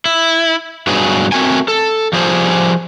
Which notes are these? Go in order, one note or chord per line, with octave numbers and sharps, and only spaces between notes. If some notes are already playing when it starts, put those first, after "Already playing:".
E4
G2 B2 F#3 G#4
A3 C4 F#4 A#4 G5 G#5
A4
F3 G3 G#4 C5